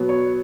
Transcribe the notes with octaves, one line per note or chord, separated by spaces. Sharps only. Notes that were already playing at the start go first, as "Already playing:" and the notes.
Already playing: B2 F#3 B3
C#5